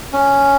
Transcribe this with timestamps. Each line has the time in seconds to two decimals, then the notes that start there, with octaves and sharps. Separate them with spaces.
0.13 C#4